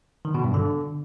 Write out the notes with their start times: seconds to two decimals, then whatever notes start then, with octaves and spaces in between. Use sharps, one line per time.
0.25 D#3
0.35 B2
0.44 G2
0.54 D3